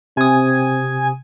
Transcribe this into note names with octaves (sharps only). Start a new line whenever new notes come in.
C3 C4 G#5 D#6